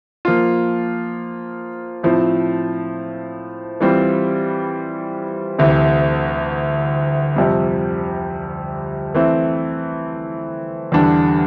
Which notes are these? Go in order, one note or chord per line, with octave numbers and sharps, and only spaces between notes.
F3 A#3 F4
A2 F3 C4
E3 G3 C4 F4
D2 C3 E3 A3
F2 C3 G3
E3 A3 C4
E2 D3 G3 D4